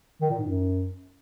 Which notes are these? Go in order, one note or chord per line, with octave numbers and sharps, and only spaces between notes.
D#3
A#2
G#2
F#2